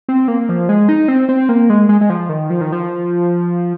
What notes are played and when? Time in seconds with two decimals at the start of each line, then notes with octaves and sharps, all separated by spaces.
0.09 C4
0.28 A#3
0.49 F3
0.69 G#3
0.89 D#4
1.08 C4
1.29 C4
1.49 A#3
1.70 G#3
1.89 G#3
2.01 G#3
2.10 F3
2.29 D#3
2.50 F3
2.61 D#3
2.72 F3